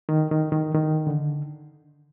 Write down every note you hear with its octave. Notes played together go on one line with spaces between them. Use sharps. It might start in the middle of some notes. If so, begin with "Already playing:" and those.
D#3
D#3
D#3
D#3
D3